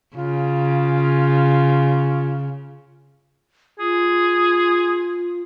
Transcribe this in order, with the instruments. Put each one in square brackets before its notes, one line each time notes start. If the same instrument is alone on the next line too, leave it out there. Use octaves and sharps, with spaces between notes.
[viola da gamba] C#3 [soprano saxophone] F4
[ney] F4 [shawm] G#4